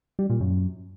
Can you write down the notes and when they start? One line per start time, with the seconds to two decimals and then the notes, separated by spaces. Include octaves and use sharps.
0.19 G3
0.30 A#2
0.41 F#2